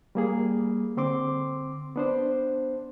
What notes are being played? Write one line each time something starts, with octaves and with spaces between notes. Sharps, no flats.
G3 A#3 G#4
D3 C4 C6 D6
B3 D4 C5